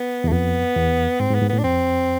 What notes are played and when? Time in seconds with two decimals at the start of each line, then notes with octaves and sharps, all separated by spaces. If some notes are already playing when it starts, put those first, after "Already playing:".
Already playing: B3
0.24 E2
0.28 A3
0.32 F2 B3
0.76 E2
1.20 G#2 C4
1.31 G#2
1.35 B3
1.42 G#2
1.49 A2 B3
1.59 D4
1.64 F2 C4